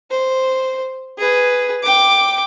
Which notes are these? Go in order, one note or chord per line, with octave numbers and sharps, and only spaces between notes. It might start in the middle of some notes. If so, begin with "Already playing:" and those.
C5
G#4 B4
G5 D6